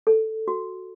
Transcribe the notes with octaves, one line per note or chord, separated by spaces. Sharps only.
A4
F#4